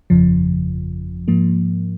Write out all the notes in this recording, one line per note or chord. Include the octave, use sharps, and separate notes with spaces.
G1 F2 C#3 F3
G#2 F3 A#3